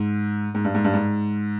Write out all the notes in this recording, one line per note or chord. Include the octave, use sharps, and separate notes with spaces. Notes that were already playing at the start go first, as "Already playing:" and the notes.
Already playing: G#2
G#2
G2
G#2
G2
G#2